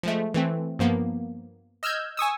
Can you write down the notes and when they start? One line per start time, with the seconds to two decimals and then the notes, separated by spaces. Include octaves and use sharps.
0.03 F3 G#3 A3
0.34 E3 A3 C4
0.79 G2 F3 A#3 B3
1.83 D#5 E6 F6 G6 G#6
2.17 G#5 C#6 D#6 E6